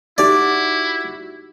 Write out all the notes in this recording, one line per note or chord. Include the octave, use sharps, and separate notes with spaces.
D#4 E4 F#4 G4 D5 E5